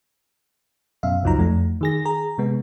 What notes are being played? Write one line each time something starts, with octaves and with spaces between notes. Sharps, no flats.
F#2 B2 E5 F5
C2 F2 F3 F#3 D#4 A#5
F2 A3
D#3 G#4 A#6
G#4 A#5
C3 G#3 B3